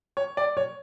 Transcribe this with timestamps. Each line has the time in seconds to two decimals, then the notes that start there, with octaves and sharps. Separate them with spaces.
0.17 C#5
0.37 D5
0.57 C#5